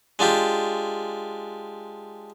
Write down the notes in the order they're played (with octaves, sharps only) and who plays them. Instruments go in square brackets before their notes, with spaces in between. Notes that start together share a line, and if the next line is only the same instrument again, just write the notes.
[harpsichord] G#3 D4 F4 G4